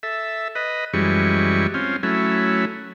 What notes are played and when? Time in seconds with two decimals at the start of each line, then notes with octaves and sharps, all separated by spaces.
0.03 A4 E5
0.55 B4 D#5
0.94 F#2 E3 G3 G#3 C#6
1.74 C4 C#4 F4
2.03 F#3 A3 C#4 E4